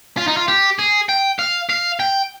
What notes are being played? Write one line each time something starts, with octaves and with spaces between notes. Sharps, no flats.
F4
D#4
F4
G4
G#4
G5
F5
F5
G5